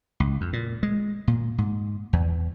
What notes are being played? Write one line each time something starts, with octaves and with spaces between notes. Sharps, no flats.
C#2
F2
A#2
G#3
A#2
G#2
E2